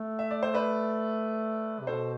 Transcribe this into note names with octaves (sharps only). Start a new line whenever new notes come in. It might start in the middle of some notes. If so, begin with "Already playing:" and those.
Already playing: A3
E5
D5
C5
B4 D5
C3
B2 A4 C5